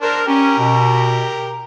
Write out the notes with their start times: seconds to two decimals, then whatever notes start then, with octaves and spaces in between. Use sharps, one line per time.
0.02 D4 A#4 C5
0.27 C#4 G4 A#4
0.58 B2